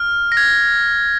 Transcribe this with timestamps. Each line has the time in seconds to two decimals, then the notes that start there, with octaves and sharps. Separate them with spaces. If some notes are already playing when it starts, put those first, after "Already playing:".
Already playing: F6
0.32 A#6
0.37 G#6